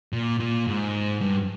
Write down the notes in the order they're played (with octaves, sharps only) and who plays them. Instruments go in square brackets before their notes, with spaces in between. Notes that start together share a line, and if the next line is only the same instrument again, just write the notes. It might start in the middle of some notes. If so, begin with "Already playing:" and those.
[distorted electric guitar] A#2
A#2
G#2
G2